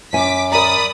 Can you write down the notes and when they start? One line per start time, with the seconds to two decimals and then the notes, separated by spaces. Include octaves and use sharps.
0.13 F#2 G#5 D6 B6
0.52 A#4 D5 A#5 B5 D#6